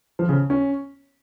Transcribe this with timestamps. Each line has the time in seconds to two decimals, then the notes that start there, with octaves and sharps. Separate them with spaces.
0.19 F3
0.29 C#3
0.50 C#4